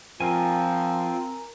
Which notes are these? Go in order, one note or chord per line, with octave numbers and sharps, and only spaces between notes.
F3 C4 F4 A#4 G#5